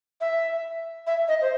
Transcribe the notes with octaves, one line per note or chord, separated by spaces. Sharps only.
E5
E5
D#5
C5